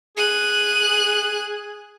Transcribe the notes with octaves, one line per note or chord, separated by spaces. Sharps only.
G#4 F#6 D#7